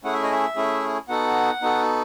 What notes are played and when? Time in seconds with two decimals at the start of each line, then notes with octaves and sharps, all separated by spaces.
0.04 A3 C#4 E4 G#4 F#5
0.13 E5
0.23 D#5
0.32 E5
0.56 A3 C#4 E4 G#4
1.09 B3 D#4 F#4 A4 F#5
1.61 B3 D#4 F#4 A4